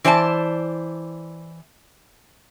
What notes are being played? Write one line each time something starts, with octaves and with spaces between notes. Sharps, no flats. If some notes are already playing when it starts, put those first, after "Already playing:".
E3 C5 D5 A5